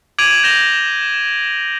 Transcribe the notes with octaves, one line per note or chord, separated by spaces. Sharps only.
D6 G#6 D7 D#7 F7 F#7
G6 G#6 A#6 E7 F7 G7